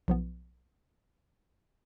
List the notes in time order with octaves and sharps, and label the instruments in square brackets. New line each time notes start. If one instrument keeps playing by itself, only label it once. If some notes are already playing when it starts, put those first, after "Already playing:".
[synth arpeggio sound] B1 F3 B3